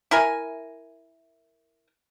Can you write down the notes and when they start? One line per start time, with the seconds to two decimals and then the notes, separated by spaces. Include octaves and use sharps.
0.11 E4 A#4 G#5